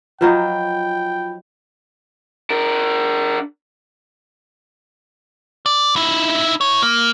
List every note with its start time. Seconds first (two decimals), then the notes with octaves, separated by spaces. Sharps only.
0.21 F3 F#3 D#4 F4 G5 B5
2.50 D4 A#4
5.66 D5
5.96 D#4 E4
6.61 E4 C#5
6.82 A#3